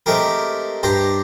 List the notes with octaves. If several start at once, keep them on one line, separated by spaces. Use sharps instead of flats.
G#3 A3 C4 G4 A#4
G2 G4 C5 A#5